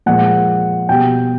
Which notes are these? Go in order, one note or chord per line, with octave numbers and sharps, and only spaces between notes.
A#2 F3 G#3 F#5
B2 G3 G5